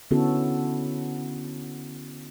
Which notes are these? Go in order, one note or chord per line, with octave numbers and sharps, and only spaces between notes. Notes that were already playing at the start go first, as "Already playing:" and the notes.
D3 B3 C#4 E4 F#4 A4